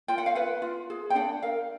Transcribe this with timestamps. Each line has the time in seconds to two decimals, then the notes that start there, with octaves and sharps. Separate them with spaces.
0.08 F4 G5
0.18 F#5
0.26 F5
0.35 B4 F#5
0.62 F4
0.90 G#4
1.10 G5
1.15 D4 F#5
1.42 A#4 F5